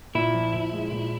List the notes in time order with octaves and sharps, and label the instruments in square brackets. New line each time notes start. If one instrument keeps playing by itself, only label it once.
[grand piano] A#2 [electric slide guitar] E4
[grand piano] F3
A#2
G#3
A#2